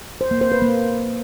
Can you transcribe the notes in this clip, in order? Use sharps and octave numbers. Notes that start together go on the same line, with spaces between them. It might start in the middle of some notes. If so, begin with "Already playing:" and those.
C5
A#3
C5
B4
A#3